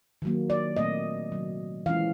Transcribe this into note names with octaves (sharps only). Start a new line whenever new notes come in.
D#3 F#3 A#3
D5
A#2 F#3 A3 C4 D#5
C3 D#3 F#3
E3 G#3 C#4 F5